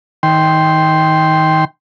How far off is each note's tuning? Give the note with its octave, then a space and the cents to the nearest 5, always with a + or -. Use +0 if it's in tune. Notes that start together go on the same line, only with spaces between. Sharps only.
D#3 +25 G5 +0 C6 +0